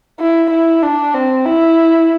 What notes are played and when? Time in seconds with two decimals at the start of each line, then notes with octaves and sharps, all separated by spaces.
0.20 E4
0.51 E4
0.83 D4
1.14 C4
1.45 E4